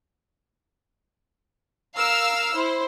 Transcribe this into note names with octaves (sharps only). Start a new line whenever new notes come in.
A#4 F5 E6 F6
E4 C5